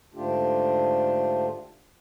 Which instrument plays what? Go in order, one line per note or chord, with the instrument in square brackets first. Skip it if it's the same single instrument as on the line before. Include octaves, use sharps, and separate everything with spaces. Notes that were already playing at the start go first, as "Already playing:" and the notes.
[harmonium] G#2 D3 A3 D4 F4 G4